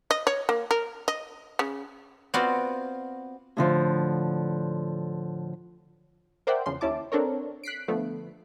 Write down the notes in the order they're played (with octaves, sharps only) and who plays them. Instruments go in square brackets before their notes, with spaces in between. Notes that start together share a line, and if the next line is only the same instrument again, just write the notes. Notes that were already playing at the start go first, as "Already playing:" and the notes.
[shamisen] D#5
C#5
A#3
A#4
D#5
C#3
[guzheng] B3 C4 F4 F#4 D5 F5
[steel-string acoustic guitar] A2 D3 F3
[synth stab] A#4 C5 D5 E5 F#5 G5
E2 C#3 F3 C6
D#2 C#4 E4 A5 D6
C4 D4 A4 A#4 C#5
F#6 B6 C7 D7
D3 F3 A3 B3